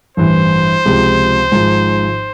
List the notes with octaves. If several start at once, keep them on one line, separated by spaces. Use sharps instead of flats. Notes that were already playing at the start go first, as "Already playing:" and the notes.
A1 G2 E3 C5
C#2 C3 F3 G#3
G#1 G#2 F3